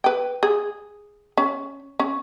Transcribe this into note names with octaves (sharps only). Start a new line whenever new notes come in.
B4 G5
G#4
C#4
C#4